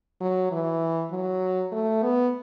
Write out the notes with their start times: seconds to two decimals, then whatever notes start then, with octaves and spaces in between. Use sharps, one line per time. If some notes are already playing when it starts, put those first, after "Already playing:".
0.21 F#3
0.52 E3
1.11 F#3
1.72 A3
2.03 B3